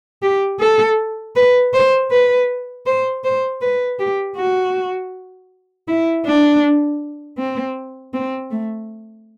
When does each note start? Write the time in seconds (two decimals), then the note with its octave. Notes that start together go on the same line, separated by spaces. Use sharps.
0.23 G4
0.60 A4
1.36 B4
1.74 C5
2.11 B4
2.86 C5
3.24 C5
3.62 B4
3.99 G4
4.37 F#4
5.88 E4
6.26 D4
7.38 C4
8.14 C4
8.51 A3